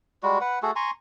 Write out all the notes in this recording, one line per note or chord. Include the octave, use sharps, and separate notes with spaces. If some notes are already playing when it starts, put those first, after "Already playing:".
G3 G#3 F#4
B4 F#5
A3 F#4 G#4 A4
G#5 A#5 C6 C#6